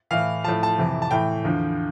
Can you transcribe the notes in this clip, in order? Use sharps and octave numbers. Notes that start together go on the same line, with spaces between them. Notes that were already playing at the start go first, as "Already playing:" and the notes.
A2 E3 F5
A2 F3 A5
A5
F2 C3 E3
A5
A2 E3 G5
E2 D3 F3